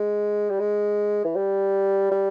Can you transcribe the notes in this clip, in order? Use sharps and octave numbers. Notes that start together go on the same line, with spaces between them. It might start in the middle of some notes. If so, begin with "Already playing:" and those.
Already playing: G#3
G3
G#3
E3
G3
G3